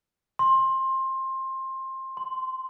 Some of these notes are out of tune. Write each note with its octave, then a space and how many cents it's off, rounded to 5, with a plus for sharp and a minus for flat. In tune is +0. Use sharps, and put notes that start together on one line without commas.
C6 +20
C6 -10